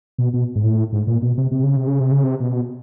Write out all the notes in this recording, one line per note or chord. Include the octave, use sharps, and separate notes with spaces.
B2
B2
G#2
A2
G#2
A#2
B2
C3
C3
C#3
C3
C#3
C3
C#3
C3
B2